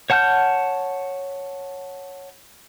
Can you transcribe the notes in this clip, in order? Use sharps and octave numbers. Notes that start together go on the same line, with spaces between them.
C#5 F#5 A5 F6 G6